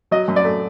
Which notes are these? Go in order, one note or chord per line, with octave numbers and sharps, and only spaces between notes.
F#3 D#5
F#2
D5
A3